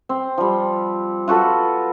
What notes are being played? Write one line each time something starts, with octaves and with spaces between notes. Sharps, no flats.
C4
F3 G3
F4 F#4 A4 B4